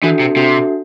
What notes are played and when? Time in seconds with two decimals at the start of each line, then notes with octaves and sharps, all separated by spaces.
0.02 E3 D4 F#4 A4 E5
0.20 C3
0.36 C3 D4 F#4 A4 E5